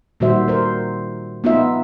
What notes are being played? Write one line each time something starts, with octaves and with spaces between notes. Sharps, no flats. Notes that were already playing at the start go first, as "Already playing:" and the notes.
A#2 D#3 G3 F#4 C5 E5
A#4 C5
B3 D#4 F4 E5